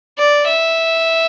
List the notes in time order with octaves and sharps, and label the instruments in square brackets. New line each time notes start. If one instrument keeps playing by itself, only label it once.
[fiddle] D5
E5